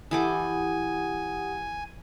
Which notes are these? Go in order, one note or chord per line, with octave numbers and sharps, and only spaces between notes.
E3 G4 A4 F#5 G#5 D6 D#6